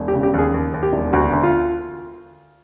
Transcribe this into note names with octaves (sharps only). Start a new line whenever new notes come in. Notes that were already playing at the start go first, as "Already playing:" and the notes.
Already playing: E1
G4
C#3
G4
D#2 G#4
D#2
D#2
G4
E1
D2 F#4
D2
F4